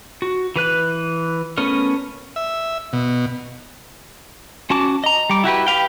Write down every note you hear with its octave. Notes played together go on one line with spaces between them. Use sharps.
F#4
E3 B4 F#6
A3 B3 C#4 A#4
E5
B2
C#4 F#4 A5 D6
D#5 A#5
G3 D6
E4 F#4 G4 B4
G4 B4 F5 G5